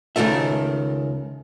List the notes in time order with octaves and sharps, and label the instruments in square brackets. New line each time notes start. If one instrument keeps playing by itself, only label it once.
[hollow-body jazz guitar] C#2 B2 D#3 A3 E5